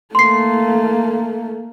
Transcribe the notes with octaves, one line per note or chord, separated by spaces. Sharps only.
A3 A#3 C6 C7